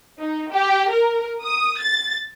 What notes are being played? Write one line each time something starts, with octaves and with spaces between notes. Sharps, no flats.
D#4
G4
A#4
D#6
A6